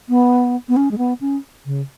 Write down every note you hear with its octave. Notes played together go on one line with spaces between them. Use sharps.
B3
B3
C#4
G#3
B3
C#4
C#3